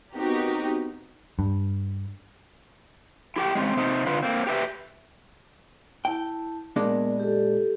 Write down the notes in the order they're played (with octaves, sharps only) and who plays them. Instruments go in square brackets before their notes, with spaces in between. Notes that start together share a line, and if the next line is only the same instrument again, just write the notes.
[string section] B3 C4 D#4 F#4 G4 A#4
[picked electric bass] G2
[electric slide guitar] E4 G4 G5
G#3 C4 C#4
C3 C4 D#4
D3 F4 B4 F5
A#3 C4
G4 B4 E5
[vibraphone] E4 A5 [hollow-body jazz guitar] G5
[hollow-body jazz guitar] A#2 G#3 D4 [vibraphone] B3 A#4
[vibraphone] G4 A4